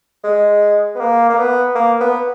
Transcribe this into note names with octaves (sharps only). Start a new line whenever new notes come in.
G#3
B3
A#3
A#3
B3
A#3
B3